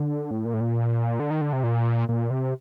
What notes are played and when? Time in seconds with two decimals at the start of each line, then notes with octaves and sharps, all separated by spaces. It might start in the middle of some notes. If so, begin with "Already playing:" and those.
Already playing: D3
0.31 A2
0.45 A#2
0.54 A2
0.60 A#2
1.20 D3
1.31 D#3
1.41 D3
1.53 C3
1.64 A#2
2.09 A#2
2.30 C3